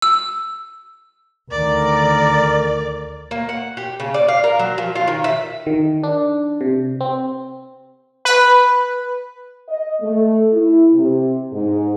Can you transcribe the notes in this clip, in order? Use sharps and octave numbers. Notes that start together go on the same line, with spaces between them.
E6
D2 D#3 A#4 D5
A#3
F#5
G4
C#3
D5
F5
A#4
F#3
F3
F4
D#3
E5
D#3
D4
C3
C4
B4
D#5
A3
E4
C3
G#2